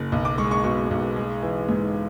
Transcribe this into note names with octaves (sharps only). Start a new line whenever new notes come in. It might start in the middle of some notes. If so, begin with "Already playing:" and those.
Already playing: F#1
B1
D6
G#3 C#6
C#6
B2 C#6
B1
G#3
E3
G#2